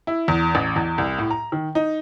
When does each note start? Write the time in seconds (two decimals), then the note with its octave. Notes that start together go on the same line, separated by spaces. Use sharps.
0.07 E4
0.28 E2
0.55 A1
0.76 E2
0.98 C2
1.19 A2
1.31 A#5
1.52 D#3
1.75 D#4